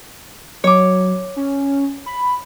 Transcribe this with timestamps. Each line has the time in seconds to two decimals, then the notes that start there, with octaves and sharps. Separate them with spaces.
0.64 F#3 C#5 D6
1.36 C#4
2.06 B5